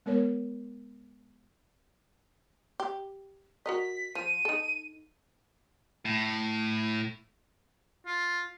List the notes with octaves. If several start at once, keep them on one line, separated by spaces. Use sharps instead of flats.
G#3 B3 A#4 C#5
G4
F#4 A#4 D#5 B6
F3 D#7
D#4 A4
A2
F4